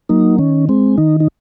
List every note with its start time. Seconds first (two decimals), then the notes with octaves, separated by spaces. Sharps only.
0.09 F#3 A#3 D#4
0.38 D#3 C#4
0.69 G#3 C4
0.98 D#3 D#4
1.20 D#4